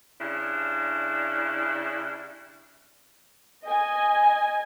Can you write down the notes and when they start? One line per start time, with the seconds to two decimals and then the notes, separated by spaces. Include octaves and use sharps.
0.19 C#3 G3 D4 E4
3.65 D#5 G#5